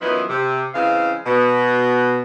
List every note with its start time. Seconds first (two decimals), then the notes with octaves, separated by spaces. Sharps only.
0.01 F#2 E3 F3 B3 D#4 E4
0.29 C3
0.74 C#3 E3 G#3 C4 F5
1.26 B2